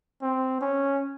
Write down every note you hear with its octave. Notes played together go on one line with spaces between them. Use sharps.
C4
C#4